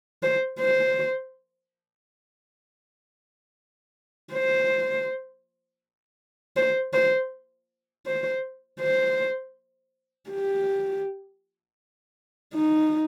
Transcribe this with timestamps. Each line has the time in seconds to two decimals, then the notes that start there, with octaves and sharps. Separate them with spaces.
0.23 C5
0.59 C5
4.33 C5
6.57 C5
6.93 C5
8.06 C5
8.80 C5
10.30 G4
12.54 D#4